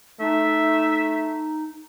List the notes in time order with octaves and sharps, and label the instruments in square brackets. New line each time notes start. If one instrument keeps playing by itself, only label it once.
[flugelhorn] A3 [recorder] D#4 [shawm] E5